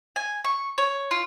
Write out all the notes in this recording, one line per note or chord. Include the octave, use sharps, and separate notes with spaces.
G#5
C#6
C#5
F4